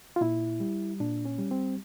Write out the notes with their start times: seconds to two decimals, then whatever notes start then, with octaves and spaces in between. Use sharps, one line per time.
0.16 F4
0.21 A#2 E4
0.60 G3
1.00 A#2 D4
1.25 C#4
1.39 G3
1.51 C4